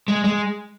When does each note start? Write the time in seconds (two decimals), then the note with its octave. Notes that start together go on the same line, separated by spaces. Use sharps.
0.08 G#3
0.24 G#3